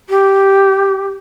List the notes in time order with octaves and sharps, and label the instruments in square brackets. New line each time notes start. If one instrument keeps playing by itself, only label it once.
[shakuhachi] G4